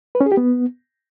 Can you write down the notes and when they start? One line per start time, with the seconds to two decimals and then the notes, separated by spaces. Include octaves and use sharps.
0.15 B4
0.21 C#4
0.26 G#4
0.32 G4
0.37 B3